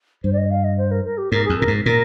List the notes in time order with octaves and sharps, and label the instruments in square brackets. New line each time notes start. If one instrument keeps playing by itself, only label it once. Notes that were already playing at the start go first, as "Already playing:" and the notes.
[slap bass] G2 [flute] C5
[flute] D5
D#5
F5
D#5
C5
A#4
A#4
G4
[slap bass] G#2 [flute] A#4
[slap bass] F2 [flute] G#4
[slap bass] A#2 [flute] A#4
[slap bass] G#2
[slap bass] A#2 [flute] A#4